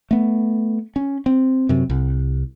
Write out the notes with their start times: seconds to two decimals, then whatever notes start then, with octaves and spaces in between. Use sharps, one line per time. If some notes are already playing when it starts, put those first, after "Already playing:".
0.11 A3 B3
0.96 C#4
1.26 C4
1.69 F#2 C3
1.90 C2